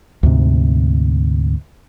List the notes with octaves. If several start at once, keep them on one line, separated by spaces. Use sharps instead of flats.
D2 G#2 C3